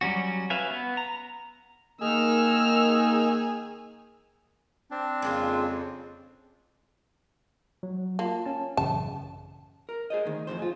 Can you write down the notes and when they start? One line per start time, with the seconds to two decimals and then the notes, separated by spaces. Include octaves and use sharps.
0.01 F#3 G3 C#4 F#4
0.50 C#4 B4 E5 F5 G#5
0.71 B3
0.97 A#5
2.01 D#3 A#3 D#4 G#4 E6 F6
4.91 C4 D4
5.22 F2 C#3 G#3 A#3 F4
7.83 F#3
8.19 A#3 F4 A5
8.45 C#4 A5
8.77 A1 F#2 C#3 A5
9.89 A#4
10.10 G#4 C5 D#5
10.26 D2 D#3
10.47 F2 A2 C3 C5
10.59 F4 G#4